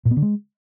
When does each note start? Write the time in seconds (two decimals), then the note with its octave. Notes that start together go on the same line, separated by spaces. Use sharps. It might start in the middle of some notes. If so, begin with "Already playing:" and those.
0.05 A#2
0.11 B3
0.17 D3
0.22 G#3